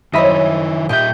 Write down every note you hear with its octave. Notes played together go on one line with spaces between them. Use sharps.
F#2 D#3 E4 C5 C#5 D#5 E5 B5
A#2 D#4 F4 G4 E5 G5 G6